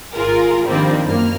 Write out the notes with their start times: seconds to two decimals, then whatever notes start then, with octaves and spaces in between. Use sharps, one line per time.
0.14 G#1 F4 G#4 A#4
0.66 D#3 F3 G3 A#3 C4 D4
1.05 F#2 A#3 F6